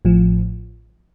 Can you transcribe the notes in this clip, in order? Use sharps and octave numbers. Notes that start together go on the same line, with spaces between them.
A1 A2 F3